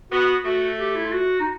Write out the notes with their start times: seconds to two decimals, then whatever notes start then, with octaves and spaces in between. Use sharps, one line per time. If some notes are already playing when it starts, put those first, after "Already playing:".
0.12 B3 F#4
0.45 A3 F#4
0.79 G4
0.95 E4
1.05 F4
1.13 F#4
1.40 D#4